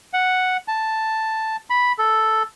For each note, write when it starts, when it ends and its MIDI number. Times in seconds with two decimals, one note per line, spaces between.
0.13 0.57 78
0.68 1.56 81
1.70 1.92 83
1.99 2.43 69